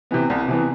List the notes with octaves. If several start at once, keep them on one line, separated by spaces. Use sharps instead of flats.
C3 E3 B3
C2
C3 E3 B3